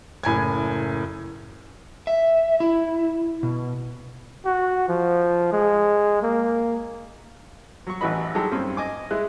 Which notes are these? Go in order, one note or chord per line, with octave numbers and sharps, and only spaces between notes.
F#1 A2 G#5 G#6
E5
E4
B2
F#4
F3
G#3
A#3
F#3 C#6
A1 E3 F#4 B4 D#5 B5
F#3 G#3 D#4 G4 A4
G2 C4 C#4
D#5 G#5 D6
G#3 E4 F#6